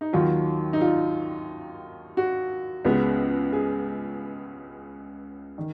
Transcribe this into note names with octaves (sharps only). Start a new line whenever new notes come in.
D#4
D#2 D#3 F#3 F4
D#4
F4
F#4
C#2 C#3 G#3 B3
G#4
D#3